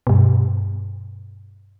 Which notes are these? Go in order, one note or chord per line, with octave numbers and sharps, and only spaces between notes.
G2 B2